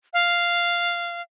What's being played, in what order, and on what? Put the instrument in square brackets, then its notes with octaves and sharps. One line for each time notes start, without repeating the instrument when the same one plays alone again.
[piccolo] F5